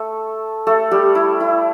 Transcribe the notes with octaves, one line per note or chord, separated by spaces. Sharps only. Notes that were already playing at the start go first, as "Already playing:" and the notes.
Already playing: A3 A4
A3 A4
G3 G4
E4
E4